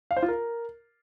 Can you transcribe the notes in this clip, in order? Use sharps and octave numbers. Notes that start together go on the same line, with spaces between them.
F5
C5
F4
A#4